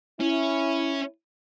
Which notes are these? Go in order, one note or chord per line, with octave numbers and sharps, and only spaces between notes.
C#4 E4